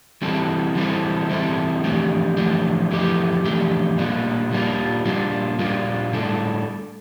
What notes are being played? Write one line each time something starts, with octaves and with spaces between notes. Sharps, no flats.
E3 G3 C4 E4 A4
E3 G3 C4 E4 A4
E3 G3 C4 E4 A4
F2 E3 A3 D4 G4
F2 E3 A3 D4 G4
F2 E3 A3 D4 G4
F2 E3 A3 D4 G4
A#2 G3 A#3 D4 F4
A#2 G3 A#3 D4 F4
A#2 G3 A#3 D4 F4
A#2 G3 A#3 D4 F4
A2 G3 D4 A4